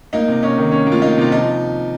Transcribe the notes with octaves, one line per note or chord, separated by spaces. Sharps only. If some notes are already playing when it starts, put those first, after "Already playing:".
A#3 D#4
C3
C#4 D#4
D#3
C#4
A#3
F4
A#3 D#4
C3 F4
F3 D#4